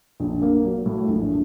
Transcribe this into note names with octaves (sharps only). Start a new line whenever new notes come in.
A#1
A#3
F#3
A2
A#1